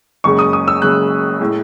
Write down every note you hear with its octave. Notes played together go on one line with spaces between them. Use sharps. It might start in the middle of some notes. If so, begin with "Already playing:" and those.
F#1 F#2 C#3 G#3 C#6
D#6
D#6
E6
F#1 F#2 C#3 G#3 F#6
A2 G#3